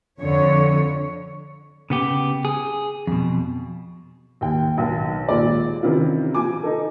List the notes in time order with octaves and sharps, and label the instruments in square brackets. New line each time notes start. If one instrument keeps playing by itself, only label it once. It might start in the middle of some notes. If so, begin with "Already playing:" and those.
[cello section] F2 D3 C#5
[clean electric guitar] C#3 B3 G4
G#4
F2 B2
[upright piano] D#2 G5
B1 D#3
D#2 A#2 G#3 D5
C3 D#3 E3 C#4 E4 F4
F3 G#5 D6
D#4 A4